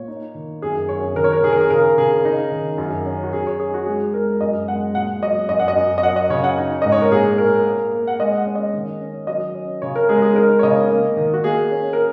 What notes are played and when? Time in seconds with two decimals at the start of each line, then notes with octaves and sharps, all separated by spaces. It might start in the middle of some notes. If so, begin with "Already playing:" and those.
Already playing: A#2 C#5
0.08 D#4
0.35 D#3
0.62 F#2 G#4
0.89 F#2 C#5
1.16 D#3 A#4
1.24 C#5
1.32 A#4
1.43 D#3 G#4
1.52 A#4
1.61 G#4
1.70 C#3 A#4
1.97 C#3 G#4
2.25 D#4
2.52 D#3
2.78 F#2
3.06 C#4
3.23 F#4
3.33 F#2 G#4
3.47 C#5
3.60 D#4 G#4
3.74 F#4
3.86 G#3 G#4
4.14 G#3 A#4
4.41 F#2 D#5
4.68 G#3 F#5
4.95 A#2 F#5
5.22 F#3 D#5
5.49 F#2 D#5
5.59 F#5
5.68 D#5
5.76 F#2
5.98 D#5
6.03 F#3 F#5
6.16 D#5
6.30 C#3 C#5
6.44 F#5
6.58 D#4
6.82 G#2 D#5
6.92 C#5
7.02 A#4
7.11 A#2 G#4
7.32 C#5
7.38 A#2 A#4
7.65 A#3
7.92 A#3
8.07 F#5
8.20 G#3 D#5
8.38 F#5
8.46 C#4
8.55 D#5
8.74 D#3
9.01 C#4
9.27 F#3 D#5
9.55 C#4
9.82 C#3 C#5
9.96 A#4
10.09 G#3 G#4
10.22 G#4
10.35 D#4 A#4
10.59 C#5
10.63 C#3 D#5
10.90 A#3
11.17 D#3
11.34 F#4
11.44 A#3 G#4
11.71 C#4
11.93 A#4